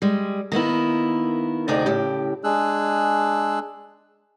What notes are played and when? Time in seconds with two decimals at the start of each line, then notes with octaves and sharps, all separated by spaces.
0.02 G3 G#3
0.52 D#3 A#3 B3 E4
1.68 D2 C3 D#4 G#4 D5 G5
1.86 A2 C#3 G4
2.44 G#3 D4 G#4 E6 F#6